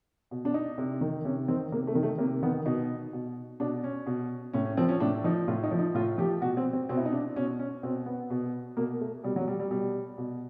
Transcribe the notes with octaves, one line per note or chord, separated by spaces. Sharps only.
B2
D4
D#4
C3
D#3
C3 C#4
D#3 C4
C3 A#3
A3
D#3
A3
C3 A#3
D#3 B3
B2 D#4
B2
B2 D4
C#4
B2
A2 C#4
C#4
F3 C4
C#4
A2 D4
F3 D#4
A2 F4
D#4
F3
D#4
A2 F4
F3 G4
B2 F#4
C4
C4
B2 C4
E4
D#4
D4
B2 C#4
C#4
B2 C4
B3
B2
B2 A#3
A3
B2 G3
F#3
G3
G3
B2 G3
B2